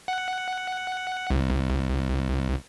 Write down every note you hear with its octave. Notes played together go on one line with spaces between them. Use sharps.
F#5
C2